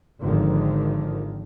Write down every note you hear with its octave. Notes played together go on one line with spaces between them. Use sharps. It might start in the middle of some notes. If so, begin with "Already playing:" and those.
G#1 D3 D#3 F3